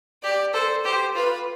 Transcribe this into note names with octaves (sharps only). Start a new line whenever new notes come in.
G4 D5
A4 C5
G4 C5
F4 B4